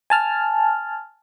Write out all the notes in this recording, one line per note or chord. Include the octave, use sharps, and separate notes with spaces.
G#5 A5 F6